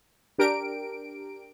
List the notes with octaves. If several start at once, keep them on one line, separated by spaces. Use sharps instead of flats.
D4 G4 A#4 D7